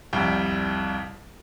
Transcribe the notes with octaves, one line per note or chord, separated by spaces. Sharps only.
C2 F2 G3 G5